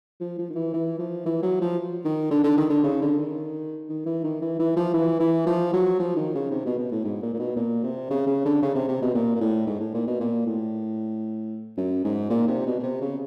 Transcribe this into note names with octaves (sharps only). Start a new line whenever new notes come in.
F3
F3
D#3
E3
E3
F3
E3
F#3
F3
D#3
D3
D3
D#3
D3
C#3
D3
D#3
D#3
E3
D#3
E3
E3
F3
E3
E3
F3
F#3
F3
D#3
C#3
C3
B2
B2
A2
G#2
A#2
A#2
B2
A#2
C3
C#3
C#3
D3
C#3
C3
C3
B2
A#2
A#2
A2
G#2
A2
A#2
B2
A#2
A2
F#2
G#2
A#2
C3
B2
B2
C3
C#3